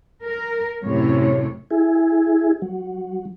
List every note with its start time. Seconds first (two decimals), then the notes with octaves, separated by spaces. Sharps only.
0.24 A#4
0.83 F#2 A2 C3 C#5
1.71 E4 G#4
2.62 F#3